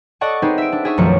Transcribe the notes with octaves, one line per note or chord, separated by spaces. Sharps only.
A4 D5 D#5 F#5 A5 C#6
B3 C4 D#4 G#4 B4
E5 D7
D4
G#4 E5 C#6
B1 F#2 D#3 F3 A3 C#7